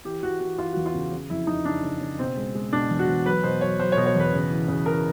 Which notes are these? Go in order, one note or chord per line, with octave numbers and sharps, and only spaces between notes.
E3 G4
E3 F#4
E3 F#4
E3 F4
E2 F#4
F4
C#3
C#3
F2 E4
F2 D#4
C#3 D4
C#3
C#3
B2 C4
G#3
G#3
B2 D4
E2
F#4
E2
F#3 B4
B2 C5
F#3 C#5
F#3 C5
B2 C#5
C#5
E2 B4
C#3
E3
C#3
E3 A#4